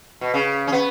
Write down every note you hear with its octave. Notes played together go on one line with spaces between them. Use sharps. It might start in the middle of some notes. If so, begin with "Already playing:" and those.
B2
C#3
C#4
B3